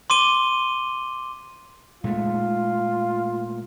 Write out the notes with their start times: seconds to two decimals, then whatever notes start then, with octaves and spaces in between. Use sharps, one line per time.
0.10 C6 D6 D#7 G7
2.04 A#2 G#3 A3 F4